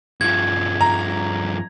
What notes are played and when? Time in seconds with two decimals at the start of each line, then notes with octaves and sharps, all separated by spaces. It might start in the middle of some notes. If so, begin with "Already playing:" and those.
0.21 G2 F3 G#6
0.81 A#5